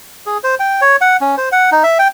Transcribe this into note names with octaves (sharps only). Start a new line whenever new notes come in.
G#4
C5
G5
C#5
F#5
C#4
C5
F#5
D#4
E5
G5